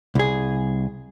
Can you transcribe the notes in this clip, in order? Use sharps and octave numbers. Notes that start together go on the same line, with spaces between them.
C2 G#4